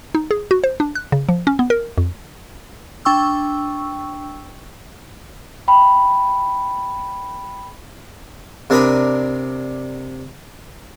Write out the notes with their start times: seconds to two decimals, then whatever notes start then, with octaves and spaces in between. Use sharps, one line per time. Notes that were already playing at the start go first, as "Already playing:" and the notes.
0.15 D#4
0.31 G#4
0.51 F#4
0.64 C5
0.80 D4
0.95 F#6
1.12 C#3
1.29 F3
1.47 C#4
1.59 B3
1.70 A#4
1.98 F2
3.05 D4 G5 C#6 E6
5.68 G5 B5
8.70 C3 D4 A#4 A#5 B5 D#6